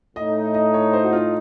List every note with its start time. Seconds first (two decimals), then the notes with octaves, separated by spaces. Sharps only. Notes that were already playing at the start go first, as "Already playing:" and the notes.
0.16 A2 A3 D#4 D#5
0.54 D#5
0.74 C#5
0.93 C5
1.04 F#4
1.13 F4